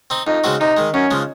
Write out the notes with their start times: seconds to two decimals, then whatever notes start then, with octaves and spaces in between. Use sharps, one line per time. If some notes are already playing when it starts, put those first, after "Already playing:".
0.10 C4 D#4
0.27 F2 D#4
0.44 C#3 G#3 C4 F#4
0.60 C3 D#4
0.77 D#3 G#3
0.94 F#2 C#4
1.11 C#3 F3 G#3